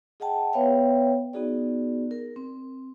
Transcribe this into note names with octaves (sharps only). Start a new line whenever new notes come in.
G#4 D#5 F#5 G5 A5
B3 B4 C#5 E5 F5 G5
B3 D#4 F#4 G#4 D5
A#4
C4